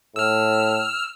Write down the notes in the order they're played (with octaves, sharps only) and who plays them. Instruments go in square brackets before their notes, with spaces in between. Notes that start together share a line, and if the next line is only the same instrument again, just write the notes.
[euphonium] A2 [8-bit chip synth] E6 F6